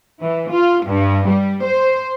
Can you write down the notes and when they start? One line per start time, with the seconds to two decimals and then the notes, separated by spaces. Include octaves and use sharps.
0.21 E3
0.51 F4
0.86 G2
1.29 G3
1.63 C5